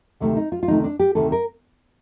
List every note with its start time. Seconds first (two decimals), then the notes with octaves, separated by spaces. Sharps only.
0.20 D2 C3 D#3 A3
0.37 D#4
0.52 F4
0.63 F4
0.68 D2 C3 D#3 A3 D#4
0.84 D4
0.99 G4
1.15 D2 C3 D#3 A3 A4
1.32 A#4